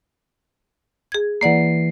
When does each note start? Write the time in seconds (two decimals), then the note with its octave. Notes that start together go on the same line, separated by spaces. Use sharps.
1.12 G#4 G#6
1.41 E3 A#3 D5 F#5 C7